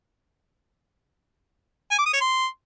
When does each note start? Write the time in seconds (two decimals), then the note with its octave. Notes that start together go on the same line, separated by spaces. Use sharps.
1.91 G#5
1.98 D6
2.06 D#6
2.13 C#5
2.21 C6